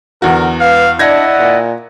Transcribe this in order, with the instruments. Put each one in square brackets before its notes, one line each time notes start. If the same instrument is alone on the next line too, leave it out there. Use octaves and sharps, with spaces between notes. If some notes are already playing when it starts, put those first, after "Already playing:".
[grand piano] E2 F#4 [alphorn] D3 [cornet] A#4
[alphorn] B4 [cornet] F5
[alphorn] D4 [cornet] E4 [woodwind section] D5 D#5 F#5 [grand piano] G#6 A#6
[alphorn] A#2